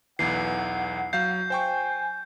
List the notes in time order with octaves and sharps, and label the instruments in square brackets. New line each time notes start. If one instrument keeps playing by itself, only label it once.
[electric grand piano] B1 E2 E3 [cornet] F#5 [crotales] C7
[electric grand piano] F#3 F5 C7 [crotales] G6
[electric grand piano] C5 G5 C#6 [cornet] G#5